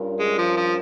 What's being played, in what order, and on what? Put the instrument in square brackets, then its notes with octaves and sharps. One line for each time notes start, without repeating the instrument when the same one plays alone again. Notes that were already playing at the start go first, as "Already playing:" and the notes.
Already playing: [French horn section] G2 G3 C#4 F4 A#4
[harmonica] G#3
F3
F3